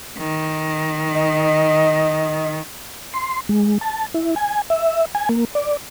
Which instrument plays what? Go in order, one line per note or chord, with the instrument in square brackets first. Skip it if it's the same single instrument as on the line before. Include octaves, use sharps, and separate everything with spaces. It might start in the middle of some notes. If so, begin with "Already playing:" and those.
[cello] D#3
[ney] D#5
[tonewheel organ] C6
G#3
A5
E4
G#5
E5
G#5
A#3
D5